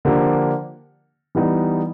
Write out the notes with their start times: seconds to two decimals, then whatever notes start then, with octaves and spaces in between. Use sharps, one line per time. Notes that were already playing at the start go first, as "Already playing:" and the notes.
0.05 D3 F3 A#3 D4 G4
1.35 E3 G3 B3 D#4